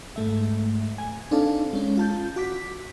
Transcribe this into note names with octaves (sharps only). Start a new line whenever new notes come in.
G#2 A3 E5
G#5
C4 D4 D#4 A4 F5 A5
G#3 C#4
F4 A5 G6
F#4 D6 B6